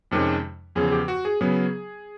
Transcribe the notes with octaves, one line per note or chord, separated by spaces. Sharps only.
F2 C3 D#3 G#3 C#4
E2 C#3 F3 G#4
G#4
G4
F#4
G#4
C#3 F#3 B3 G#4